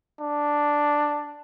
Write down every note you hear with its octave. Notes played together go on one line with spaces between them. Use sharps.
D4